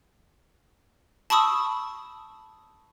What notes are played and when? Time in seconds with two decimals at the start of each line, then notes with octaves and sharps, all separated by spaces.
1.30 A5 B5 C#6 D#6 E6